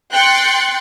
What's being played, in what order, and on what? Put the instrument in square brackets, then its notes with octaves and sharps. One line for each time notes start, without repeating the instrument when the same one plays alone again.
[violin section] G5 C6 F#6 A6 C#7